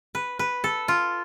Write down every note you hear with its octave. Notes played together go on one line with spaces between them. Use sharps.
B4
B4
A4
F4